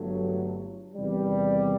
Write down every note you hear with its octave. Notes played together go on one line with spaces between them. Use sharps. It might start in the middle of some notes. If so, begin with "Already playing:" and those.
Already playing: G1 G2 F#3 A3
E2 C3 D#3 G3